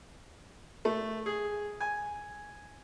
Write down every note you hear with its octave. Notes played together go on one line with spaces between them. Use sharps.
A3
G#4
G#5